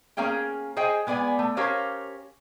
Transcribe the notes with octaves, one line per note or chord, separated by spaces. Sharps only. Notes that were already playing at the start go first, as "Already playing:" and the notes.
A#3 C#4 G#4 F5 G5
G#4 C5 D#5 G5 G#5
G#3 B3 D5 F#5 G#5
A3
C#4 G4 A#4 C5 C#5 F5